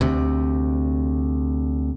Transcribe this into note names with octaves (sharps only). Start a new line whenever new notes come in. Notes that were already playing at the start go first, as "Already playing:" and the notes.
D2 C3